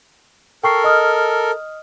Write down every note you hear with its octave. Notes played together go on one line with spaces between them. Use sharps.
A4 A#4 G5 C#6 C7
D#5 D#6 F6